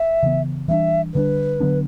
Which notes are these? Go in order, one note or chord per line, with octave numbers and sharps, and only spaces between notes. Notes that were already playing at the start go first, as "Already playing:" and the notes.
Already playing: E5
C#3 E3 B3
E3 G3 B3 D4 E5
D3 G3 B3 D4 B4
D3 F#3 B3 D4